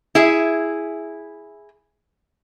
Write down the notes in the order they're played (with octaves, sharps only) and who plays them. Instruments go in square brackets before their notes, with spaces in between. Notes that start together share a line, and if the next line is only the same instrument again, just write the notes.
[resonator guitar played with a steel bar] E4 G#4 E5